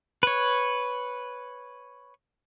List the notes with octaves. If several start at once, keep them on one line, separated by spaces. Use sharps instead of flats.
B4 C#5